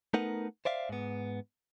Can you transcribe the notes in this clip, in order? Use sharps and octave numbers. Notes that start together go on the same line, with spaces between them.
A3 B3 D#4 A#4 B4 F#5
C5 D5 E5 F5
G#2 B3